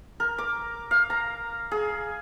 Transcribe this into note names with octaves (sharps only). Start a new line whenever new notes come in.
A#4
D6
F5
A#5
G#4